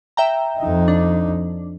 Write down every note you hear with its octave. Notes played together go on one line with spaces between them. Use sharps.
E5 G5 A#5
F2 D#4
D4